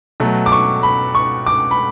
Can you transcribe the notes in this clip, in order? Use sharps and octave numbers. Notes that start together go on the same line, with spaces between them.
B2 F#3 A3
D6
C#6
B5
C#6
D6
B5